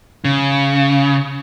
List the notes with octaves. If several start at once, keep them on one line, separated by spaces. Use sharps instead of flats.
C#3